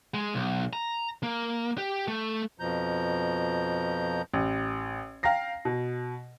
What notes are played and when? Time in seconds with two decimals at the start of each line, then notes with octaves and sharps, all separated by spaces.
0.14 G#3
0.35 B1
0.73 A#5
1.23 A#3
1.78 G4
2.08 A3
2.60 F2 B2 F3 A#5 G6
4.33 A1
5.23 F5 G5 A#5 A#6 C7
5.65 B2